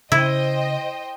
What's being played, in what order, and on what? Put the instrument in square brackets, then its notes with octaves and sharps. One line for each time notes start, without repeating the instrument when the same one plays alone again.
[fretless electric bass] C#3 [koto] E4 [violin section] C5 D#5 G5